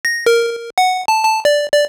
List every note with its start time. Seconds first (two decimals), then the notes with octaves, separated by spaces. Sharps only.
0.05 A#6
0.26 A#4
0.78 F#5
1.08 A5
1.25 A5
1.45 D5
1.73 D5